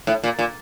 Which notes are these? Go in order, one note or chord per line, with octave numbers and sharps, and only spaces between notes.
A2
A#2
A#2